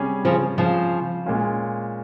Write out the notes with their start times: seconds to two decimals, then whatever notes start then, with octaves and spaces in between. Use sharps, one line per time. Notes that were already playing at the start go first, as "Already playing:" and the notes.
Already playing: C3 G3 C#4 G#4
0.25 C#3 F3
0.58 C#3 F3
1.26 A#2 G#3 C#4 F4